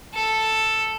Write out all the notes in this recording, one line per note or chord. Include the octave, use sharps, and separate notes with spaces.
A4